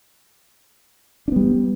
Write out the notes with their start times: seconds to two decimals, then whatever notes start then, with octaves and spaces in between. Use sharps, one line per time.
1.28 D4
1.32 B3
1.36 G3